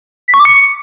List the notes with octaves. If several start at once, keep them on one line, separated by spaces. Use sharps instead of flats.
B6
C#6
D6
C#7